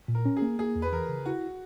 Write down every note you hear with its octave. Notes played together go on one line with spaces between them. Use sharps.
A#2
A#4
C#4
G#4
A#3
A#3 G#4
E2
B4
E3 A#4
C#3
E4 F#4